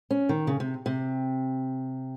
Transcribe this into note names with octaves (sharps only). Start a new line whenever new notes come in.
C#4
D#3
C#3
C3
C3